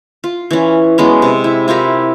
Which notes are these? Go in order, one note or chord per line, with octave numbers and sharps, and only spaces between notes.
F4
E3 C#4
F#3 G#3 B3 C#4
C3
E4
E4 F4 G4 A#4